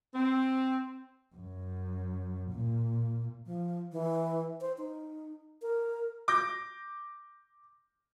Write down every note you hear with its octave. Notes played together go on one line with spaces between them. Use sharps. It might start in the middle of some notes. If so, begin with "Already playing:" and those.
C4
F#2
A#2
F3
E3
C5
D#4
A#4
D6 G6 A#6